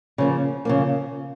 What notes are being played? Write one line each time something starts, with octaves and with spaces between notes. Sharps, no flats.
C#3 F3 A#3
C#3 F3 A#3